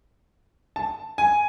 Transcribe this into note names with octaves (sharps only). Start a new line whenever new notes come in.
A5
G#5